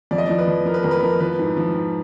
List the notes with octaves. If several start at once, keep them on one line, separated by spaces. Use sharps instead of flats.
F2 D5
D#5
D5
F3
B4
F3
F3 A#4
B4
F2 A#4
B4
A#4
F3
F3 B4
G#2
F3
G#2